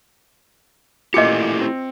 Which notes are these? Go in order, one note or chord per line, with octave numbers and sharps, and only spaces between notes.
A#2 A3 E4 F4 G4 D#5 D6 C#7
C4